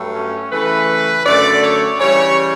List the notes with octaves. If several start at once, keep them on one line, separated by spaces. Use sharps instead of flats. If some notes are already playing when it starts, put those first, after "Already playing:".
Already playing: G2 F#3 A3
C#4
C#3 E3 A3 B4
F#2 D3 A3 D5
C#5
C#3 E3 G3 C#5